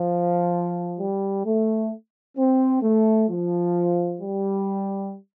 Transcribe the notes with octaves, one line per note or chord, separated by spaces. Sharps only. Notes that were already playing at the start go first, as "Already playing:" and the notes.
Already playing: F3
G3
A3
C4
A3
F3
G3